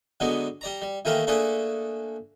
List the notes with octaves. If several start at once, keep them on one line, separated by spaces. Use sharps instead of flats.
D3 F#3 G#3 B3 D#4
G3 D5 A#5
G3
D#3 E3 A3 A#3 G4 A#4
A3 A#3 D4 G#4 A4 B4